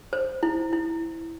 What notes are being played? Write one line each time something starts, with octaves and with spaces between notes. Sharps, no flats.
C5
E4
E4